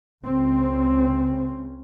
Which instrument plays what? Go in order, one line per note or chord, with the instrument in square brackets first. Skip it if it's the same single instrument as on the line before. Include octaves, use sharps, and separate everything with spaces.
[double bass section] C#2 C#3 C4